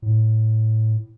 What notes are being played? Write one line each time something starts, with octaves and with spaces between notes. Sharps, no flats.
A2